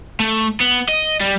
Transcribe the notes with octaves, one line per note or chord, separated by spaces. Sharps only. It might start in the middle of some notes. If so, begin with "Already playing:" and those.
A3
B3
D#5
G3